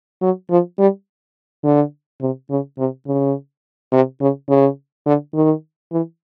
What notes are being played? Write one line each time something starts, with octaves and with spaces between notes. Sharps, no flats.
F#3
F3
G3
D3
C3
C#3
C3
C#3
C3
C#3
C#3
D3
D#3
E3